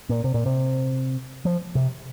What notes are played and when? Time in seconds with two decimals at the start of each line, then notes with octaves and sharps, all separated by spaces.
0.09 A#2
0.24 C3
0.34 A#2
0.46 C3
1.45 F3
1.75 C3